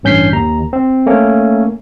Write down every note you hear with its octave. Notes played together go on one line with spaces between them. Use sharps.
A1 G2 C#4 G6 B6 C7
D#2 A#5
C4
A3 A#3 C#4